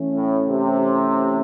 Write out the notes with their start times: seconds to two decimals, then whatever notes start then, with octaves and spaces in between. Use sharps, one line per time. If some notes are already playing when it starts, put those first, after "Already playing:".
Already playing: E3 A3 C#4
0.15 A2
0.49 C3